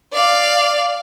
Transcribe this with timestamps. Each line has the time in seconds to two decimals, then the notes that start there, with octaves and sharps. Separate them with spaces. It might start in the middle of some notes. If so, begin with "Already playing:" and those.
0.13 D5 F5